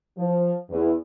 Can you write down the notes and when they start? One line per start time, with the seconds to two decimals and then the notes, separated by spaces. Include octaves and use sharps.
0.17 F3
0.69 E2